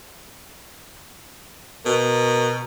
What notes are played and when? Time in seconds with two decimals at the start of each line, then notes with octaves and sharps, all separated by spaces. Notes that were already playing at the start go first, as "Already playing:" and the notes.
1.86 B2 A#4